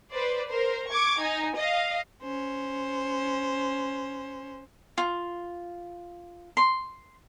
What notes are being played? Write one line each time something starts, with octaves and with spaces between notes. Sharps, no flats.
B4 C5 D5
A#4 C5
C#6 D6 G#6
D#4 G#5
D#5 F5
C#4 C5
F4
C6